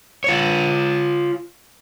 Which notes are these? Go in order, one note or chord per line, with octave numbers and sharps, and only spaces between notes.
F4 C#5